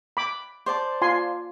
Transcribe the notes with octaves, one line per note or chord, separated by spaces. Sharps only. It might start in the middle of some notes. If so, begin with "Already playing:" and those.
B5 D6
C5 D5 A5
F4 G#5 C6